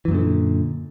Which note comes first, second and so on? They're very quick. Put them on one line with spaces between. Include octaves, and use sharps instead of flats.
E3 F#2 A#2 D3